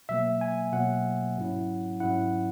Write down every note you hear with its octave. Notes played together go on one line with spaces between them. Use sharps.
B2 F#3 A#3 E5
G#5
B2 F#3 A#3 F#5
G#2 F#3 C#4 E4
G#2 F#3 C#4 E4 F#5